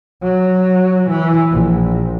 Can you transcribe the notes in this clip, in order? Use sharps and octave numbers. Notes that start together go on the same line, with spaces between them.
F#3
E3
A#1